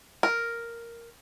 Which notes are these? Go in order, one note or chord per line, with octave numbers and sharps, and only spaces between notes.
A#4